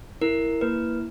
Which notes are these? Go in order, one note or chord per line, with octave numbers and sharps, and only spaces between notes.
E4 A#4
A#3 B4